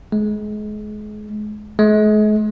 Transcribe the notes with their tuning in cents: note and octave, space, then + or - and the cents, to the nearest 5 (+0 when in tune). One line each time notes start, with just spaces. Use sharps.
G#3 +30
G#3 +40